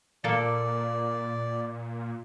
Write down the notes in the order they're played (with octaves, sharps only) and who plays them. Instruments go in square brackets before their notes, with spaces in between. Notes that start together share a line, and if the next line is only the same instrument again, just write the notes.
[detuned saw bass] A#2 [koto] A#3 A4 [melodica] D5